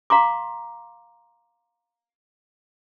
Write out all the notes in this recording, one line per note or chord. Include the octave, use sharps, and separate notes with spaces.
F5 A#5 C6 D6